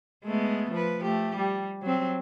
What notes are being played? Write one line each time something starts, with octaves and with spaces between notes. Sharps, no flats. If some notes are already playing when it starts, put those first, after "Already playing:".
G#3 A3 B3
F3 B4
A3 G4
G3
F#3 C4